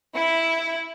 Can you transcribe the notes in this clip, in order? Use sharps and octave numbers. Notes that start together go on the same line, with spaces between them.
E4